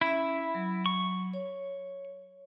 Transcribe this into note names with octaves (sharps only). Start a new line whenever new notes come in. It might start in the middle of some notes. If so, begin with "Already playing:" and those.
C#4 E4 E5
F#3
C#6
C#5